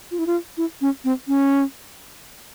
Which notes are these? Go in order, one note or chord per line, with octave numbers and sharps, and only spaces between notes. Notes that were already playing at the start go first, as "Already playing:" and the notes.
F4
E4
F4
E4
C#4
C4
C#4